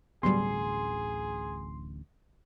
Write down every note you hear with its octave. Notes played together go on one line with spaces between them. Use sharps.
D1 A1 D2 B2 F#3 G3 G#4 C6